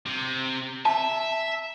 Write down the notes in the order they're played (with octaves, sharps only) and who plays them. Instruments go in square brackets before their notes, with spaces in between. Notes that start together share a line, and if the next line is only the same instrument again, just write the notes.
[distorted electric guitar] C3
[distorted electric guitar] E5 [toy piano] A5